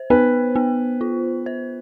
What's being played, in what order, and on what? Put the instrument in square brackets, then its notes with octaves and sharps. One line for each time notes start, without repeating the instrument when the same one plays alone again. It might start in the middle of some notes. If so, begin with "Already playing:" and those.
Already playing: [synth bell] C5
[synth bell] B3 [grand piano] B4
[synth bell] B3
F4
C5